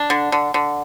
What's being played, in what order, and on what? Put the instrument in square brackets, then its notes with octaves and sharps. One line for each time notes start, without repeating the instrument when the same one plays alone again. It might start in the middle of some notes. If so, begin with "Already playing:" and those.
Already playing: [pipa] D4
D3
D3
D3